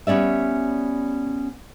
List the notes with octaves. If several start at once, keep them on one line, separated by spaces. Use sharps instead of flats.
G3 B3 C#4 D5 E5